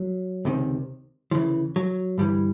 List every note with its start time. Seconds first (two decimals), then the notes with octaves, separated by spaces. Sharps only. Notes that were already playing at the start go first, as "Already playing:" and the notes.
Already playing: F#3
0.45 C#2 C3 D#3
1.31 D2 C#3 E3 F3
1.76 F#3
2.18 D2 G2 E3 G3